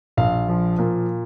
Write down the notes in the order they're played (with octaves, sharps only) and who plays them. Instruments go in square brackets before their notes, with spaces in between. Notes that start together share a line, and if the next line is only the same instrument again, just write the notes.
[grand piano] A#1 F5
F3
A#2